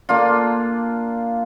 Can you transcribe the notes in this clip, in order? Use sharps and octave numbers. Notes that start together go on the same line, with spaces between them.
A#3 D4 F4